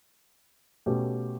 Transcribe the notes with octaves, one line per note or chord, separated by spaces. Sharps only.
B2 A3 C#4 G4